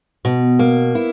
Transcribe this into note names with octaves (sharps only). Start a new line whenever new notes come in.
B2
A#3
E4